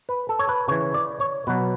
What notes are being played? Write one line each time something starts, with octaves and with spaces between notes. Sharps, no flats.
B4
A4
C#5
B4
C#3 E3 C#5
D5
C#5
B2 F#3 B4